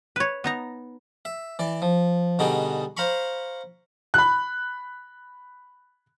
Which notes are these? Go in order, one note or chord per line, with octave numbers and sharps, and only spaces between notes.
B4 C#5
B3 D#4 A#5
E5
E3 D5
F3
B2 D3 G3 D#4 F#4 G#4
C5 F5 A#5 B5 C#6
B5 F#6